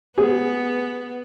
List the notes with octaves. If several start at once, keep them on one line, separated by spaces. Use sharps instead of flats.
B3 G#4